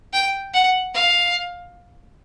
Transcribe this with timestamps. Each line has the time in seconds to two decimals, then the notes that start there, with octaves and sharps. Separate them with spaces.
0.13 G5
0.54 F#5
0.94 F5